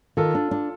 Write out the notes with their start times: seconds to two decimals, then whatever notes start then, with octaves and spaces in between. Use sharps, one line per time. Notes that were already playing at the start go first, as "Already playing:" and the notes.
0.17 D#3 F4 A4
0.35 D4
0.51 D4